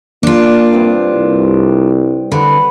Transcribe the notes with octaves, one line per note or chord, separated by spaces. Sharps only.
A#3 D4 F4
G2 C3 C5
C2
D3 F#4 B4